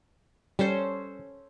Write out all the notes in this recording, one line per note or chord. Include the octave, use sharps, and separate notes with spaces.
G3 C#4 A4 C5